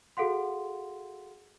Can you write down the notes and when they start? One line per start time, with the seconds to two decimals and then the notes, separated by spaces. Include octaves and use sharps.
0.17 F#4 G#4 A4 F5 F#5 C6